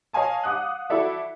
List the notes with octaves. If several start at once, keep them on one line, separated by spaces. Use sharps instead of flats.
C#5 D#5 F5 G#5 A5
F5 F#5 D6 D#6 F#6
E4 F#4 A4 D5 E5